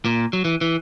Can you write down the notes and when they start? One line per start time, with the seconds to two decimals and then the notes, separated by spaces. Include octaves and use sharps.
0.05 A#2
0.33 F#3
0.45 E3
0.61 E3